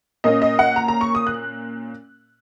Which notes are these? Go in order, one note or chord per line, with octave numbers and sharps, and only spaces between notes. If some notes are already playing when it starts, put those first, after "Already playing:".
A#2 A#3 C#4 D#5
D#5
F#5
A#5
A#5
C#6
D#6
F#6